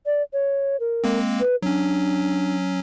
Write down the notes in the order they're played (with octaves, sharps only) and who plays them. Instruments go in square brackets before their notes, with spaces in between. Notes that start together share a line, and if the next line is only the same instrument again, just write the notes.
[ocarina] D5
C#5
A#4
[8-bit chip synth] G#3 A#3 C4
[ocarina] B4
[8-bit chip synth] F#3 C#4 [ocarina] D4